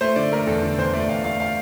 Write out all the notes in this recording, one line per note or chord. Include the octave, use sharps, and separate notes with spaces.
A3 C5
D3 D5
A3 A#4
E2 A4
D3
E2 C5
A3 D5
E2 F5
A3 F5
F5